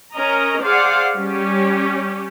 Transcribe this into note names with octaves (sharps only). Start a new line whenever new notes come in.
C#4 A#4 D#5 A#5
G#4 C5 D5 F5 F#5
G3 C#4 G4